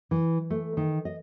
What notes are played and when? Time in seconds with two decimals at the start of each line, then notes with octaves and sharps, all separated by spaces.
0.11 E3
0.50 A3
0.77 D#3
1.05 D#5